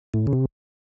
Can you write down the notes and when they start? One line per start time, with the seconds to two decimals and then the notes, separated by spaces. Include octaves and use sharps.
0.14 A2
0.27 C#3
0.33 C3